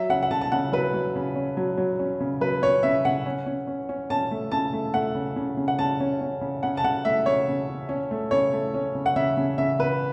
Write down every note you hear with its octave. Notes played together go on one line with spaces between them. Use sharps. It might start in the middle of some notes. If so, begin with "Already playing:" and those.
Already playing: F#3 E5
C#3 F#5
F#5
C#3 A5
A5
C#3 F#5
F#3 B4
F#3
C#3
C#4
F#3
F#3
C#4
C#3
F#3 B4
C#4 C#5
C#3 E5
C#3 F#5
C#4
C#4
C#4
C#4
C#4 A5
A3
C#3 A5
A3
A3 F#5
C#3
C#3
C#3
F#5
C#3 A5
C#4
C#4
C#3
C#3 F#5
A5
C#3 F#5
A3 E5
C#3 C#5
C#3
C#4
C#4
A3
C#3 C#5
A3
C#4
C#3
F#5
C#3 E5
C#3
C#3 E5
C#3 B4